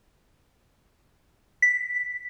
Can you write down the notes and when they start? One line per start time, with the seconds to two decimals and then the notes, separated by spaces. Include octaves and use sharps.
1.62 B6